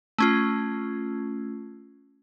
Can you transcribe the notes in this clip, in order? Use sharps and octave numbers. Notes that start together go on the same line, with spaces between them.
A3 C#4 F4